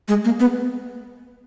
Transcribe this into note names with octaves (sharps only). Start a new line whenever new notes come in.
G#3
A#3
B3